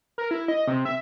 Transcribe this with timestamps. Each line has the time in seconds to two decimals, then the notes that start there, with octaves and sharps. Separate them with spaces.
0.18 A#4
0.31 E4
0.48 D#5
0.67 C3
0.85 E5